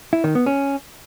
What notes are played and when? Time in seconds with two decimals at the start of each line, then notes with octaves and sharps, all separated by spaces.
0.13 E4
0.24 D#3
0.35 B3
0.46 C#4